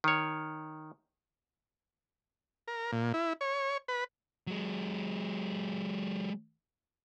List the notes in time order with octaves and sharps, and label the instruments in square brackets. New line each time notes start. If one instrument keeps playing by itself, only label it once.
[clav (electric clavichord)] D#3 C#5
[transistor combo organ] A#4
A#2
E4
C#5
B4
[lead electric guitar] F#3 G#3